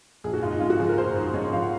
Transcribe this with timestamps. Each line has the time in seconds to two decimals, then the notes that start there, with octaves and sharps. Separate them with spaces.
0.24 A#1 G#4
0.34 F#4
0.42 G#2 F4
0.51 D#4
0.60 G#3 F4
0.70 F#4
0.79 F3 G#4
0.89 A#4
0.97 A#1 C5
1.16 G#2
1.34 G#3 C#5
1.53 F3 F5
1.62 F#5